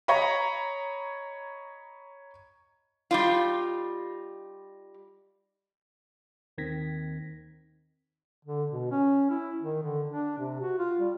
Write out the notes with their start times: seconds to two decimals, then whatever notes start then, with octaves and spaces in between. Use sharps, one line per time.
0.08 C#5 D#5 A#5 B5
3.11 G3 D#4 F4
6.58 D#2 D#3 C4 G#6 A#6 B6
8.45 D3
8.71 B2
8.91 C#4
9.30 E4
9.62 D#3
9.83 D3
10.10 D4
10.38 C3
10.61 F#4
10.79 F4
10.99 G3